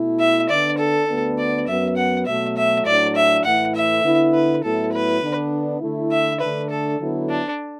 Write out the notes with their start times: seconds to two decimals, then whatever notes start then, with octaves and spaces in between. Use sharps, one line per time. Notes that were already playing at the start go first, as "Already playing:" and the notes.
Already playing: B2 A3 E4
0.20 E5
0.49 D3 B3 D4 D5
0.78 A4
1.08 D2 D3 B3 D4
1.38 D5
1.67 F#2 F#3 B3 E5
1.97 F#5
2.26 B2 F#3 A3 E5
2.57 E5
2.85 A2 F#3 D4 D5
3.16 E5
3.45 A2 E3 A3 E4 F#5
3.75 E5
4.05 D3 B3 E4
4.34 B4
4.63 A2 F#3 B3 E4 A4
4.93 B4
5.22 D3 B3 D4
5.81 D3 A3 E4
6.12 E5
6.41 D3 A3 D4 B4
6.70 A4
7.00 D3 F#3 B3 E4
7.30 D4